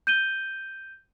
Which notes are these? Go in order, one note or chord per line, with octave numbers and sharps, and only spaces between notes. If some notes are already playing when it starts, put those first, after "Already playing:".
G6 D#7 G7